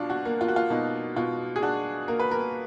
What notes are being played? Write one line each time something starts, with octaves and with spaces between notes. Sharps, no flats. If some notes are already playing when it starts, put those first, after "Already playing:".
Already playing: B2 D4 F4
F#4
A#3
F4
F#4
F4
B2 D#4
B2 F4
G#4
D4 F#4
A#3 A#4
B4
A#4